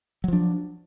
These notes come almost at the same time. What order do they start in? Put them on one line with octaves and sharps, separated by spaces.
F#3 F3 D4